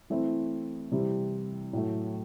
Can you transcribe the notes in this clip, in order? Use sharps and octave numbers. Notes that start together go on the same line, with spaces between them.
E3 A3 C4 E4
C3 E3 G3 C4 E4
A2 F#3 A3